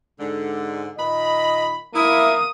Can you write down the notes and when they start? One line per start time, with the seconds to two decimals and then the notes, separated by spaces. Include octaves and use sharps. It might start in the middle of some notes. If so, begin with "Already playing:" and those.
0.19 G#2 D3
0.98 A#2 D#3 D#5 B5
1.95 A#3 E4 D#6